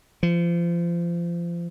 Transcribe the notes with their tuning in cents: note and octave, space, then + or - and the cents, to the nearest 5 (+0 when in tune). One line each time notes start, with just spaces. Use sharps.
F3 -30